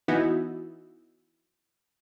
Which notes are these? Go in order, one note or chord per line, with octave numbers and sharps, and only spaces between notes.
E3 B3 D#4 E4 F#4